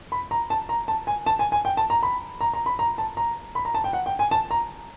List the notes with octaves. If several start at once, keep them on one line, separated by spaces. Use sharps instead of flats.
B5
A#5
A5
A#5
A5
G#5
A5
G#5
G#5
G5
A5
A#5
B5
A#5
A#5
B5
A#5
A5
A#5
B5
A#5
A5
G5
F#5
G5
G#5
A5
A#5